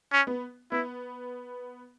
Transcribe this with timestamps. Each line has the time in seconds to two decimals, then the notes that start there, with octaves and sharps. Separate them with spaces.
0.13 C#4
0.27 B3
0.72 B3 E4